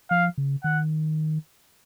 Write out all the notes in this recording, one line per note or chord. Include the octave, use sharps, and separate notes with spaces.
F3 F5
C#3
D#3 F#5